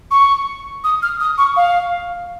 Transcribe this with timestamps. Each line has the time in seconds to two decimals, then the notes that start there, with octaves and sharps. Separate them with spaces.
0.11 C#6
0.84 D#6
1.03 F6
1.20 D#6
1.38 C#6
1.57 F5